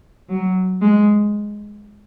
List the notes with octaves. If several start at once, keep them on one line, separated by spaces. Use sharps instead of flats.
F#3
G#3